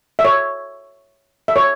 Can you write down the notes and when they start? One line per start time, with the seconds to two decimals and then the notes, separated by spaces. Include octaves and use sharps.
0.19 E5
0.25 C#5
1.48 E5
1.56 C#5